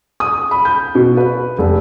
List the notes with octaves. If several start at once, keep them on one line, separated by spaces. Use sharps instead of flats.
D#6
B5
G6
B2
B4
F1